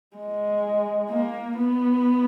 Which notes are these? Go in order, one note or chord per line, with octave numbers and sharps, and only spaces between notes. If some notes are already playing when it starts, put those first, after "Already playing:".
G#3
A#3
B3